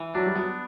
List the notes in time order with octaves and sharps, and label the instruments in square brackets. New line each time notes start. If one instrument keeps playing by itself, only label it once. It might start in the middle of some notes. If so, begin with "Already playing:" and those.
Already playing: [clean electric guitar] E3
[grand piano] F#3 [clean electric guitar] D4
[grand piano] G3
[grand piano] F#3 [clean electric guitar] B3